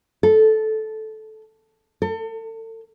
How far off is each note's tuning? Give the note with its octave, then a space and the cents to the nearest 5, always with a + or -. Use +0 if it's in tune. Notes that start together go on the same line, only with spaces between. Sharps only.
A4 -10
A4 +35